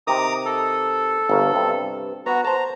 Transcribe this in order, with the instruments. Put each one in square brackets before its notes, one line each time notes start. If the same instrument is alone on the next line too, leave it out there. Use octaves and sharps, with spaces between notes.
[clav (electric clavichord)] C3 D#3 [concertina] A#5 D6 D#6
[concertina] A4
[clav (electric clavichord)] G1 A#4 F5
G2 C3
[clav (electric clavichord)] B3 [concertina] F#4 A#5
[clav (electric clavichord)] C5 A5 [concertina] A#5